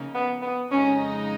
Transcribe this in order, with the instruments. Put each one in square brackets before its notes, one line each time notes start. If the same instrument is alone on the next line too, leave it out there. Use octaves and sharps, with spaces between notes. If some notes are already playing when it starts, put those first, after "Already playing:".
Already playing: [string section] C#3 F3 A#3 D#4
[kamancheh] B3
B3
[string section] F2 C#3 G#3 D#4 [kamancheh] C#4